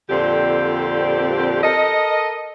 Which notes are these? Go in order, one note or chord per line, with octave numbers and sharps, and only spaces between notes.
F2 A#2 D3 C4 G4
A4 A#4 D#5